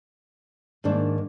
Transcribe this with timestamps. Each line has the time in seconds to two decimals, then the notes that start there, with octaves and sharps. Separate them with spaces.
0.84 G#2 D#3 A#3 D4